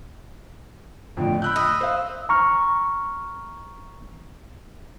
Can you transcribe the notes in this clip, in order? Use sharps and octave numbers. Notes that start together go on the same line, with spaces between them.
F2 A2 D3 G5
B5 E6 F#6 G6
D#5
C5 F5
A#5 C#6 F6